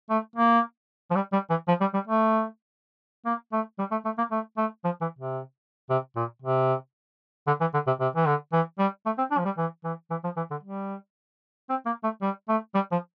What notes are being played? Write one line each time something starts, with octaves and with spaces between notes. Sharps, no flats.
A3
A#3
F3
G3
G3
E3
F3
G3
G3
A3
A#3
A3
G3
A3
A3
A#3
A3
A3
F3
E3
C3
C3
A#2
C3
D3
E3
D3
C3
C3
E3
D3
E3
G3
A3
C4
D4
F3
G3
E3
E3
E3
F3
E3
D3
G3
C4
A#3
A3
G3
A3
G3
F3